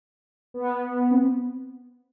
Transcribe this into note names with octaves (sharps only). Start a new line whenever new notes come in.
B3
C4